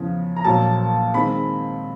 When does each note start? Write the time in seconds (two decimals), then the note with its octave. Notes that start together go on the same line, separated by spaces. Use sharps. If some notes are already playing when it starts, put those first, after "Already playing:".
Already playing: E2 C#3 F3
0.36 A#5
0.44 A#1 A#2 F#3 A5
1.14 D#3 G#3 C4 B5